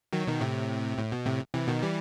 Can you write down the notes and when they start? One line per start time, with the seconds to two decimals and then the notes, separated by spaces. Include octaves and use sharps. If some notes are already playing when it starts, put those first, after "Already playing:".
0.13 D#3 F#3
0.27 B2 D#3
0.41 A2 C3
0.98 A2
1.12 B2
1.25 A2 C3
1.54 C3 E3
1.68 B2 D#3
1.83 E3 G3